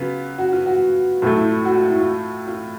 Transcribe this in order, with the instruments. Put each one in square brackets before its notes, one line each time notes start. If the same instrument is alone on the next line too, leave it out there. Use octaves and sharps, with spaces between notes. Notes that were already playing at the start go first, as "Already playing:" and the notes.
Already playing: [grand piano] C#3 F#3 B3 [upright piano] F4
[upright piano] F#4
F4
F#4
[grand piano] A2 F#3 A3 [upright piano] F4
[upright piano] E4
F4
F#4
F4
E4
F4
F4